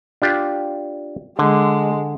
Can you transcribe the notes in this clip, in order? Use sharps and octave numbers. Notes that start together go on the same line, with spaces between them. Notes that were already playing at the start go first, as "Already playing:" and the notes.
D4 F4 G4
D3 G#3